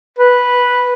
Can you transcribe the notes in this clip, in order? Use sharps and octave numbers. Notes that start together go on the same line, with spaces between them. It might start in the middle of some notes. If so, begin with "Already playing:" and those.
B4